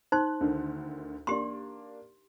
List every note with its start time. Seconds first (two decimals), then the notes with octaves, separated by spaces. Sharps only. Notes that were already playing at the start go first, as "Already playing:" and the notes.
0.12 D#4 C5 C6 F#6
0.41 D2 D3 D#3
1.27 A#3 D4 G4 C6